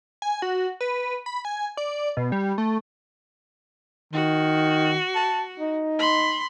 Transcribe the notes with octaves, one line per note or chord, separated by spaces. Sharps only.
G#5
F#4
B4
B5
G#5
D5
B2
G3
A3
D#3 F#4
A5
D#4
B5 C6